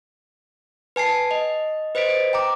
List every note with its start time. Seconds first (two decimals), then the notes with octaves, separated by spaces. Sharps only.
0.96 B4 G#5 A5 C7
1.31 D#5
1.95 B4 C5 D#5 B6 D7
2.33 G5 A#5 D6